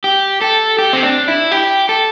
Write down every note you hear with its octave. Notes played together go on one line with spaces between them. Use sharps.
G4
A4
G4
C4
D4
E4
G4
A4